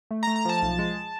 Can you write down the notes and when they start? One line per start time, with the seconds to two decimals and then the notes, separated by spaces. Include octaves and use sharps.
0.11 A3
0.23 A#5
0.27 A3
0.36 A#5
0.45 F3 A5
0.62 B1
0.79 G#3